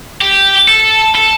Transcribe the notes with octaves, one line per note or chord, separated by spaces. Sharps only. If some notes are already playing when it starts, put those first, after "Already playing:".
G4
A4
A4